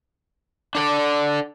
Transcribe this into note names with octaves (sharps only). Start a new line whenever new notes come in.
D4 A4 D5